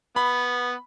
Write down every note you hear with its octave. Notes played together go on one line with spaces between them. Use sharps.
B3 B5